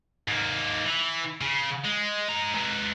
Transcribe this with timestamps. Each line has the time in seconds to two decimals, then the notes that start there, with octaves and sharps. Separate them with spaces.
0.28 G#2 A#3
0.85 E3
1.41 C#3
1.85 G#3
2.29 G#3 A#5
2.54 G#3 B4